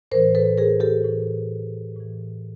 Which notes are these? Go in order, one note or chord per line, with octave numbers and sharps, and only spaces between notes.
A2 E3 A#4 C5
A4 B4
G#4 A#4
G4 A4
A2 E3
A2 E3